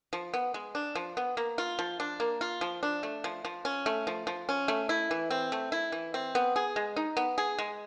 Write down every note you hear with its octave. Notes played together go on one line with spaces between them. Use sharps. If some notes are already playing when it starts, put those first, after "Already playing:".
F3
B3
G#3
D4
F3
B3
A#3
F4
F3
D4
A#3
F4
F3
D4
A3
F3
F3
C#4
A3
F3
F3
C#4
A3
E4
E3
C4
A3
E4
E3
C4
B3
G#4
G#3
D#4
B3
G#4
G#3